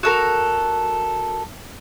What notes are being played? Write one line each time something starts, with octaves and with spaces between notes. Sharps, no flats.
F#4 A4 A#4